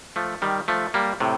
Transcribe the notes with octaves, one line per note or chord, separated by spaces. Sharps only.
F3 A3
D#3 G3
F3 A3
G3 A#3
A2 C3